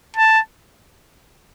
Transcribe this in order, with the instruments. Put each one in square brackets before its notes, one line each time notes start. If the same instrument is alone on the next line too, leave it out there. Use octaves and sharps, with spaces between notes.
[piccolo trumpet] A5